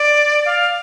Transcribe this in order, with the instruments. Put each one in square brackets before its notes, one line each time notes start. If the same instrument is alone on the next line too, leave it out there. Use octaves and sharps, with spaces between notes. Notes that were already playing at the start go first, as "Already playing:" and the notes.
Already playing: [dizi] D5
F5